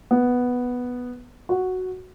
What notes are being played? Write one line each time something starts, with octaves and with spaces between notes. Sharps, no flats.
B3
F#4